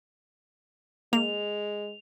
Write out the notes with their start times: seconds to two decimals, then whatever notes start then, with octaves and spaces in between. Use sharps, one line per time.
1.13 G#3 A#3 F7